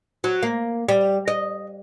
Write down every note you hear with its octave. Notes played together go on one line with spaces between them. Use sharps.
F#3
A#3
G3
D#5